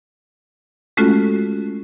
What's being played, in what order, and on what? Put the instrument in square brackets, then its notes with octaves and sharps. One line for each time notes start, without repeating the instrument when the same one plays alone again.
[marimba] G#3 A3 C#4 F4 F#4 A4